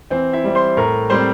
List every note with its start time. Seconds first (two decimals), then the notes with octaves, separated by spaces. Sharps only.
0.10 E3 C4 C5
0.33 E4 E5
0.44 G3 C4
0.55 C5 C6
0.77 A2 A#4 A#5
1.10 G3 C4 C5 C6